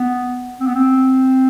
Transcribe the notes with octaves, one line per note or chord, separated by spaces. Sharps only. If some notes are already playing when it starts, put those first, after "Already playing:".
Already playing: B3
C4
B3
C4